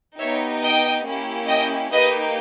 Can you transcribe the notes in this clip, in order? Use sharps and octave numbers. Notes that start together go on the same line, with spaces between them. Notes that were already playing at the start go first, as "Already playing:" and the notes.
B3 D#4 G4 C#5 E5
D#5 G5
A#3 C#4 E4 G4
D#5 G5
A#3 D#4 G4 B4 D#5